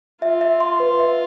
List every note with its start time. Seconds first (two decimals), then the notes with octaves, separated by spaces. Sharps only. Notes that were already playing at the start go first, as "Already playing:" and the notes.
0.22 F4 E5
0.41 E5
0.60 C6
0.80 B4
0.99 E5